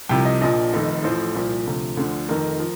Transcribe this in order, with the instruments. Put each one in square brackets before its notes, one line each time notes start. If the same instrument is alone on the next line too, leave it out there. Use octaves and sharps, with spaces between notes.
[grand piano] C2 C3 F3 G5
D#5
A#1 A#2 F3 D#5
F1 F2 D#3
A1 A2 F3 C5
C2 A#2 F3
D2 C3 F3
D2 D3 F3
F1 F2 D#3 A#4
F3